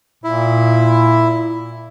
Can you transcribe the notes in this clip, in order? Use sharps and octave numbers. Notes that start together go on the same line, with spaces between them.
A#2 E4